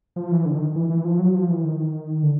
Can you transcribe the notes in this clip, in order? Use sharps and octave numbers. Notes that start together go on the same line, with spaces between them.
F3
E3
D3
D#3
E3
E3
F3
F#3
F3
E3
D#3
D3